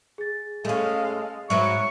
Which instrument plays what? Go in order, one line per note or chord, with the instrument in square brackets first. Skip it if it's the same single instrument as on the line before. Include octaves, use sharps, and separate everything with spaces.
[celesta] G#4 A6
[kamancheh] G#3 F5 [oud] A3 C#4
[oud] G#2 F#3 B3 [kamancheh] C#5 [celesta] E5 A#5 [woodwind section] C#6